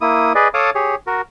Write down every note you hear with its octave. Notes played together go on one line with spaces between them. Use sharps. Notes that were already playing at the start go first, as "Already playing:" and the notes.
A#3 E4 D#6
G#4 B4 D5 D#5
A4 C#5 F5 A5 D6 D#6
G4 G#4 C#5
F#4 A#4